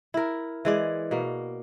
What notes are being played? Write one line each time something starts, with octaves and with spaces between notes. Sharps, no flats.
E4 A#4
E3 G#3 D5
B2 A#3